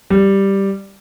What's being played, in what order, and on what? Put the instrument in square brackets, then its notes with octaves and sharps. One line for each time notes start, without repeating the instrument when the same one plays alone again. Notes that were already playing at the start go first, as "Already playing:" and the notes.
[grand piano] G3